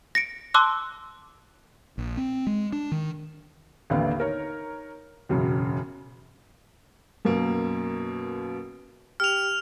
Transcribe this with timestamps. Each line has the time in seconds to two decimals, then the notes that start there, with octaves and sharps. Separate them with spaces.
0.15 A#6 C#7 D7
0.54 A5 C6 D6 E6 F#6
1.98 A#1
2.17 C4
2.47 G#3
2.72 D4
2.92 D#3
3.90 A1 D#2 D3 B3 F5
4.18 D#4 A#4 C#5
5.29 E1 F#2 C#3 F#3
7.25 F#2 B2 A#3
9.20 G4 F6 F7